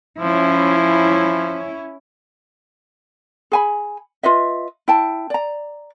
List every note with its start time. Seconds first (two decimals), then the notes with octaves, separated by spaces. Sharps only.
0.20 F3 C#4 E4
3.52 G#4 G#5 B5
4.23 F4 B4 D#5 E5
4.88 E4 G5 A5
5.30 D5 A#5